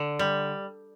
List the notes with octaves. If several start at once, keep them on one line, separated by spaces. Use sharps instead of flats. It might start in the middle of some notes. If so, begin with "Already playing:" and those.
Already playing: D3
G3